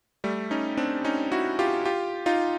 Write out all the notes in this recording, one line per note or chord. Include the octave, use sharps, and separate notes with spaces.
G3 A3
C#4 D#4
C4 D4
C#4 D#4
E4 F#4
F4 G4
F4 G4
D#4 F4